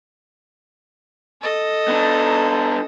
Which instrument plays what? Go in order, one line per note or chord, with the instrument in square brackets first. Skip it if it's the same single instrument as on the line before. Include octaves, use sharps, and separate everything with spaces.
[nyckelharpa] A4 D#5
[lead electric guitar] B3 D4